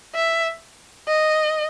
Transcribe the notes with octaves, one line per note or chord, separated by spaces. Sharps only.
E5
D#5